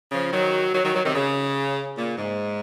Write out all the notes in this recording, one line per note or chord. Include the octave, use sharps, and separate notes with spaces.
C#3 F3
D#3 F#3
D#3 F#3
D#3 F#3
D#3 F#3
C3 D#3
C#3
A#2
G#2